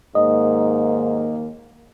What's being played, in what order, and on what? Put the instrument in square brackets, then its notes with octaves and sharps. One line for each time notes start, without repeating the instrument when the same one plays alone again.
[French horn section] D#2 D#3 A#3 [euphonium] G#2 [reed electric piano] D#5